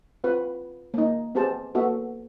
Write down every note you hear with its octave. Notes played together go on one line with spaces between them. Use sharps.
C4 F4 B4
A#3 D#4
B3 C4 G4 G#4 C5 A5
A#3 B3 F#4 A4 E5